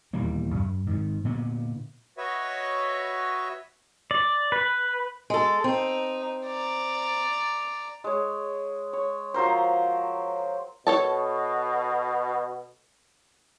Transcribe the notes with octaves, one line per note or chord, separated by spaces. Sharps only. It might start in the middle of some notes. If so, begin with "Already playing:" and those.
D#1 E2 G3 A#3
F#2
G#2 D#3
A#2 D3 B3
F#4 B4 C#5 D#5 E5
D5
B4
G#3 A4
C4 D#4
D5 A#5
G#3 C#5
C#5
F3 F#3 A#4 C5
B2 A4 C#5 A5